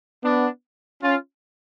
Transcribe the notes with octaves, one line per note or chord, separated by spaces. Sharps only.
B3 D4
C#4 F4